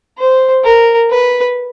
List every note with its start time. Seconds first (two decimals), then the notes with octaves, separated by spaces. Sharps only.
0.18 C5
0.64 A#4
1.10 B4